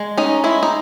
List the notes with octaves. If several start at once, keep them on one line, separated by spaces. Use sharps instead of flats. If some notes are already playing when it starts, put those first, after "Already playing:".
Already playing: G#3
C#4 D#4
G#3 E4
D#4